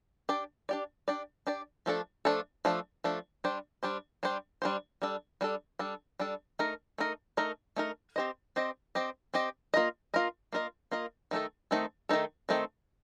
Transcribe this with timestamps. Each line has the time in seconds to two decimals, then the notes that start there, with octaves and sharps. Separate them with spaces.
0.29 D4 G4 D5
0.69 D4 G4 D5
1.08 D4 G4 D5
1.47 D4 G4 D5
1.86 F3 A3 D4 A4
2.25 F3 A3 D4 A4
2.65 F3 A3 D4 A4
3.04 F3 A3 D4 A4
3.44 G3 D4 G4 C5
3.83 G3 D4 G4 C5
4.23 G3 D4 G4 C5
4.62 G3 D4 G4 C5
5.02 G3 D4 A4
5.41 G3 D4 A4
5.79 G3 D4 A4
6.19 G3 D4 A4
6.59 A3 D#4 A#4
6.98 A3 D#4 A#4
7.37 A3 D#4 A#4
7.76 A3 D#4 A#4
8.16 C4 G4 C5 D#5
8.56 C4 G4 C5 D#5
8.95 C4 G4 C5 D#5
9.34 C4 G4 C5 D#5
9.74 A#3 F4 A#4 D#5
10.14 A#3 F4 A#4 D#5
10.53 A#3 F4 A#4 D#5
10.91 A#3 F4 A#4 D#5
11.31 D#3 A3 C4 D#4 A4
11.71 D#3 A3 C4 D#4 A4
12.09 D#3 A3 C4 D#4 A4
12.49 D#3 A3 C4 D#4 A4